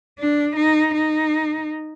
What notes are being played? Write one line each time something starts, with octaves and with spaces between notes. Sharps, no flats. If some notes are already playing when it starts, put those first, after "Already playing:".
D4
D#4
D#4